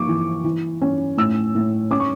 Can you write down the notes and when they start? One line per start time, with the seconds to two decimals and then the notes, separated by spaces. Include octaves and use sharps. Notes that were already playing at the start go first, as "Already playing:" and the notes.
Already playing: F3 A#3 C#6 D6
0.08 E3
0.44 E3
0.82 C#4
1.17 A2 E6
1.55 A2
1.91 C#4 D6
2.00 C#6